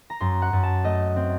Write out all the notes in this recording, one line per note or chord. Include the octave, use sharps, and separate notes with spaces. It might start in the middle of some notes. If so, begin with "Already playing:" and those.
A#5
F#2 C6
F#5
F#2
A5
A3 D#5
C4